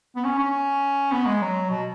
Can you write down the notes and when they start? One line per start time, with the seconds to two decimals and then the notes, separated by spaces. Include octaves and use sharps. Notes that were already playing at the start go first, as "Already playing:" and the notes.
0.16 B3
0.24 C#4
0.39 C#4
1.12 B3
1.26 G#3
1.41 F#3
1.70 B2